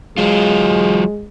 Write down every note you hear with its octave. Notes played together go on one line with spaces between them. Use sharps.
F#3 G#3 F4